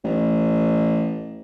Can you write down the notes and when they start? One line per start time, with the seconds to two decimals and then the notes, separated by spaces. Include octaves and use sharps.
0.04 A1